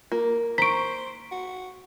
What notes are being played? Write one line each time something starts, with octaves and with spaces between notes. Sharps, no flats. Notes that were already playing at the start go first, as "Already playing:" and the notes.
A#3 F4
C5 A#5 C#6 B6 D7
F#4